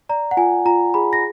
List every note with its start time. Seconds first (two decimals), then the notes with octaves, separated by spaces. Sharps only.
0.09 D5 A#5
0.31 F#5
0.37 F4 G#5
0.66 F4 A#5
0.94 G#4 B5
1.13 A#6